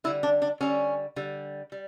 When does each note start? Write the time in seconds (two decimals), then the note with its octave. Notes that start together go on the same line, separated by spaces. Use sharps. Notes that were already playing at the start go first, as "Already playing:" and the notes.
0.04 D3 G3 E4
0.23 D4
0.42 D4
0.61 D3 G3 C#4
1.16 D3 G3
1.72 G3